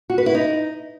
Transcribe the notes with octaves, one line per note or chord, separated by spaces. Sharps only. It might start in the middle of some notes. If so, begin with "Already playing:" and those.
F#4
B4
E4
D#4